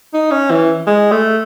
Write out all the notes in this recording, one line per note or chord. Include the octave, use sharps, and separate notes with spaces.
D#4
C#4
E3
G#3
A3